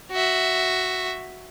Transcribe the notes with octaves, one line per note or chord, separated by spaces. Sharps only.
F#4 E5